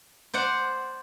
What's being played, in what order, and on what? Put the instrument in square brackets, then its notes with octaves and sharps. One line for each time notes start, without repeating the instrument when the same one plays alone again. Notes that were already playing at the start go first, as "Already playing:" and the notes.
[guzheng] C5 D5 F#5